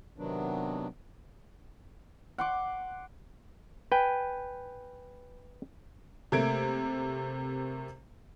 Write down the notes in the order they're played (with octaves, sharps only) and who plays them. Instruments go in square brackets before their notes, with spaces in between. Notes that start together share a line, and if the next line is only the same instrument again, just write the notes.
[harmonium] C3 D#3 F#3 B3 D4
[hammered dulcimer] F#5 C6 D6
[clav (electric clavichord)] B4 G5 G#5
[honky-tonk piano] C3 A3 A#3 G#6 D7